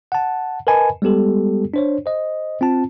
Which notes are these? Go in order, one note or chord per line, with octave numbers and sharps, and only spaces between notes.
F#5 A5
A#4 B4 D#5 G#5 A5 B5
G3 G#3 B3 G4 A4
D4 C5 C#5
C5 D#5
C4 F4 A5